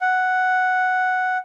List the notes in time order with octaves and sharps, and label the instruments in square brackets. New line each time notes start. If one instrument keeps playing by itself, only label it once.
[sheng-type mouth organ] F#5